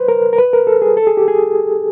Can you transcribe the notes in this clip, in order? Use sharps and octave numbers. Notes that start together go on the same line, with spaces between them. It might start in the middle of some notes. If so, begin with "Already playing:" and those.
Already playing: B4 C5
A#4
A#4
B4
A#4
A4
G#4
A4
G#4
G4
G#4